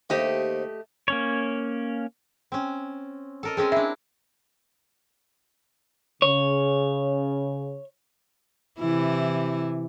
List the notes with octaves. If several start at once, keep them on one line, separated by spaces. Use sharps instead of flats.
D#2 A3 G4 C5 D#5
A#3 C#4 C#5
C4 C#4
A4 A#4 D#5
G#3 C4 C#4
D4 E4 E5
C#3 C#5
C3 E3 E4